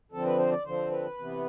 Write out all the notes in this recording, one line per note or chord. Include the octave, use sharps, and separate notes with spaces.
D3 F3 C4 A4
B4
C5
D5
D3 F3 C4 C5
B4
C3 E3 B3